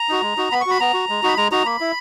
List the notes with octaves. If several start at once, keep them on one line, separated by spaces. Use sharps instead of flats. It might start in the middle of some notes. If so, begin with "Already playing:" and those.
Already playing: A#5
D#4 F#4
G#3
D#4 F#4
B3 B5
C#6
F#4 B5
B3 A#5
F#4
G#3
D#4 F#4 B5
G#3 A#5
D#4 F#4 A#5
A#3 B5
E4